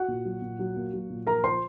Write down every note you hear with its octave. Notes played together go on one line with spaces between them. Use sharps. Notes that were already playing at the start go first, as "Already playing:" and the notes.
Already playing: F#4 F#5
A#2
F#3
A#2
F#3
A#3
F#3
A#2
F3 A#4 A#5
F3 C5 C6